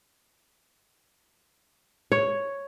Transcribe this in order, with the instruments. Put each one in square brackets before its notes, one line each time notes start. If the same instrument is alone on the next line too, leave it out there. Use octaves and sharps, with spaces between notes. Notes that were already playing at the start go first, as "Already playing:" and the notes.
[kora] C#5